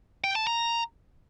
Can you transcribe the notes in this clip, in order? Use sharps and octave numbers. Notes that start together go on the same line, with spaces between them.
G5
A5
A#5